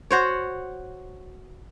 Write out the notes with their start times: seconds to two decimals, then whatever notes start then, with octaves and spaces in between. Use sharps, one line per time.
0.11 F#4 C5 C#5